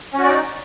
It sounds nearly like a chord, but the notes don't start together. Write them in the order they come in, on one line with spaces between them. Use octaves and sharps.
C#4 F#4 D5 D#4